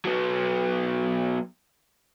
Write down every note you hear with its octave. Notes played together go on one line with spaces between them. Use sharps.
F#3 B3